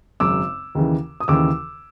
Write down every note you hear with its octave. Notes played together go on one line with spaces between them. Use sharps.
G#1 F#2 C#3 D6 E6
D#2 C#3 E3
D#6
D#2 C#3 E3 D6 E6